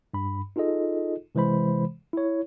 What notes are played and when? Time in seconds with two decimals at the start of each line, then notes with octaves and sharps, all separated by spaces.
0.14 G2 B5
0.56 D#4 F4 G#4 A4 D#5
1.35 C3 E3 G#3 C5 B5
2.13 E4 C#5